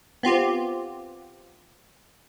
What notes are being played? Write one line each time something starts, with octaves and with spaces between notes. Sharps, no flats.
B3 C4 F4 G4